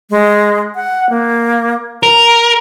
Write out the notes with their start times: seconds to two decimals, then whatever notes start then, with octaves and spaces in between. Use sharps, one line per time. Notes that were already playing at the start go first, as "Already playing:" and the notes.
0.10 G#3
0.75 F#5
1.10 A#3
2.03 A#4 A#5